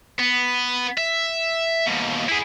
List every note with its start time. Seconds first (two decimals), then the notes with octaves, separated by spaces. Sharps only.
0.19 B3
0.98 E5
1.86 D#2 B2
2.28 E4 G#4